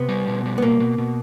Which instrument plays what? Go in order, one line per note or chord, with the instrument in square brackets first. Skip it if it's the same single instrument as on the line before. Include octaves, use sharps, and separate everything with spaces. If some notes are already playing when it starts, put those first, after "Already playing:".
Already playing: [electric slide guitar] C3 [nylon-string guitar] B3
[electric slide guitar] G3
B2
G3
[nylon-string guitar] B3
[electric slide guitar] B2 [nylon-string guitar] A#3
[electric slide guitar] B2
B2